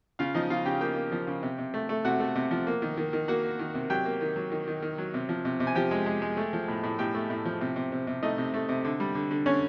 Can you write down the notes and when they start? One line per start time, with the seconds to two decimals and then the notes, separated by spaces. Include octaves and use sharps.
0.19 C#3 F4 F5
0.35 F3 D#4 D#5
0.50 C#3 F4 F5
0.65 C#3 G4 G5
0.81 A#3 G4 G5
0.96 A#3
1.12 F3
1.27 C#3
1.43 C3
1.58 C3
1.74 A3
1.89 A3
2.05 C3 F#4 F#5
2.20 A3
2.35 C3
2.51 F3
2.67 A#3
2.82 D#3
2.97 D#3
3.13 D#3
3.28 A#3 F#4 F#5
3.43 A#3
3.59 D#3
3.74 C3
3.90 F#3 G4 G5
4.05 A#3
4.21 D#3
4.36 F#3
4.52 D#3
4.68 D#3
4.82 D#3
4.98 F#3
5.14 C3
5.29 F3
5.45 C3
5.60 C3
5.67 G#5
5.75 F3 G4 G5
5.91 G#3
6.06 G#3
6.22 G#3
6.37 A3
6.53 F3
6.68 A2
6.83 A2
6.99 A2 G4 G5
7.14 A3
7.30 A2
7.45 F3
7.61 C3
7.76 C3
7.92 C3
8.07 C3
8.22 A3 D#4 D#5
8.38 C3
8.54 A3
8.69 C3
8.85 D3
9.00 G3
9.15 D3
9.31 D3
9.46 D3 C#4 C#5